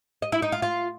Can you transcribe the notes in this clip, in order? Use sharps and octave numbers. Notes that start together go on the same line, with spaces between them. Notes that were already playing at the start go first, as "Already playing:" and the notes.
D#5
E4
D#4
F4
F4